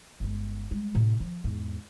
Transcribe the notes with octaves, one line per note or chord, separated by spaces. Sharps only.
G1 G#3
G3 G#3
A2 C3
F3
E2 G#2